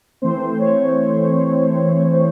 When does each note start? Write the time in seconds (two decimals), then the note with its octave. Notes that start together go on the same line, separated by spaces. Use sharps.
0.22 E3 A3 C4 C5
0.40 C5
0.59 C#5